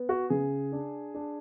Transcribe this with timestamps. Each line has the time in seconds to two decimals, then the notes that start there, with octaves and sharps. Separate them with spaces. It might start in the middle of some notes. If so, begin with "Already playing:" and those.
Already playing: B3
0.09 F#4
0.30 C#3 G#4
0.72 D4
1.15 D4